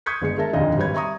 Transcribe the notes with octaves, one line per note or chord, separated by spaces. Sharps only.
C#6 D#6 G6 G#6 B6 C#7
G1 G#3 C#7
G#3 A#4 E5 A5
F1 D#2 A#2 D3 D#5
G#1 G3 B4 C#5 B5 G#6
E5 A#5 C#6 D#6